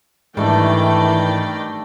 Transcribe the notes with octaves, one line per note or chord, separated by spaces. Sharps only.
G#2 D#3 E3 G3 A3 D4 D5 G5